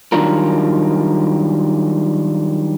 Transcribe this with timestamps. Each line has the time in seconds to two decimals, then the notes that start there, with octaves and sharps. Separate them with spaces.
0.12 D#3 F#3 G3 D4 F4 A#4